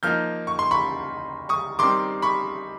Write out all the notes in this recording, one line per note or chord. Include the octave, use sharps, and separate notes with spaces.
F3 A#3 D#4 F6 G6
C#6
C6
B5 C#6
C#6 D#6
D#3 G3 C4 C6 D6
B5 C#6